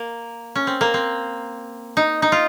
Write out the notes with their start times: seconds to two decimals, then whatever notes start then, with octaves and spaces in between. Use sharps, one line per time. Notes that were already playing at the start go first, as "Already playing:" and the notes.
Already playing: A#3
0.55 C#4
0.67 C4
0.81 A#3
0.94 C4
1.97 D#4
2.22 D#4
2.32 F4